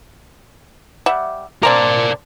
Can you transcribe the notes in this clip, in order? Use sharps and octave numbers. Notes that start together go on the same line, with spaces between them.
G3 E5 F#5
A#3 C4 D4 A#4 D5